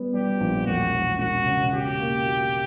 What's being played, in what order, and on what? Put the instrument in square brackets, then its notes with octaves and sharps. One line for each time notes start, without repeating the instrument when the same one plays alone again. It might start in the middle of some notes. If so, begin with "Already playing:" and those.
Already playing: [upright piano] G3 B3
[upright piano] G3 [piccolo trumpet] G4
[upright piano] A#1
[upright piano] E1 [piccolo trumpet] F#4
[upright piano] E1
[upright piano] E1 [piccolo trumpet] F#4
[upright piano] C#3
[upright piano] F#4 [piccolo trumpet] G4
[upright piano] A#3
F#4